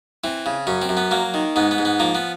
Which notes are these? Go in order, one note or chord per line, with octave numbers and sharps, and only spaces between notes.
E3 C4
C#3
F#2 C#4
C4
F#2
B3
F#3 A#3
D#3
G#2 B3
B3
G#2
B3
F3 A#3
B3